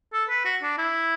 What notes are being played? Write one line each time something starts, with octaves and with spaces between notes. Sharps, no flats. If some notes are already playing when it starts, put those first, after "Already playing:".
A4
B4
F#4
D4
E4